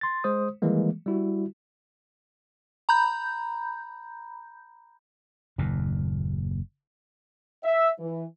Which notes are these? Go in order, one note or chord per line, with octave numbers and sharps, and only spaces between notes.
C6 A6
G#3 C5 D#6
D#3 E3 G3 G#3 A#3
G3 E4 F#4
A#5 B5 G6
F#1 D#2 A#2
E5
E3